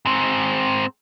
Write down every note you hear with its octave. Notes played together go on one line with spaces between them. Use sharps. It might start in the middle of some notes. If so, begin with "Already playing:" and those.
G#2 C4